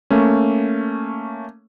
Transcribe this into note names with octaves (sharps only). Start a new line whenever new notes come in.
A3 A#3 C#4